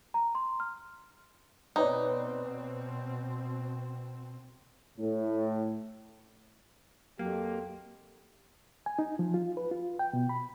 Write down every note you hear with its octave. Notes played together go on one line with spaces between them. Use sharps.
A#5
C6
F6
B2 C4 D#4 B4 C#5 D5
A2
F2 F#3 A#3 G4
G#5
D#4
F3
F4
B4
F4
G5
B2
B5